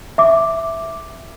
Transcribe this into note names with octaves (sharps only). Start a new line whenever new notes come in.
E5 D6